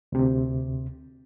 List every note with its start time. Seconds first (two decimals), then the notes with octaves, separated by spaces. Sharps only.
0.12 D2 C3